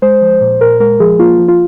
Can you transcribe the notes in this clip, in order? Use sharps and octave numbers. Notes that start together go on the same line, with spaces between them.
G#3 C5
F3
A#2
A#2 A#4
G#3 A#4
F3 G#4
A#3 F4
F3
F4